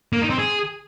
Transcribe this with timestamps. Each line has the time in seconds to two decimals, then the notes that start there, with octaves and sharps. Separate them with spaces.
0.13 A#3
0.21 D#4
0.30 C4
0.39 G#4